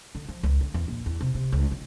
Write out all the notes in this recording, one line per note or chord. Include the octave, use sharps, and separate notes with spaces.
D3
F3
C#2
D3
E2
A#1
E2
C3
C3
C#2
D#3